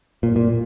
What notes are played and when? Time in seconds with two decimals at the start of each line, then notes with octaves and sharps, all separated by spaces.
0.23 A#2
0.36 A#2